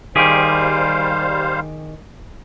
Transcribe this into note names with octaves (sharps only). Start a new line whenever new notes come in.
D#3 G3 G4 G#4 C5 F5